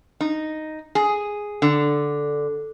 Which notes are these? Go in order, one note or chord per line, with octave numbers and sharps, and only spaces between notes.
D#4
G#4
D3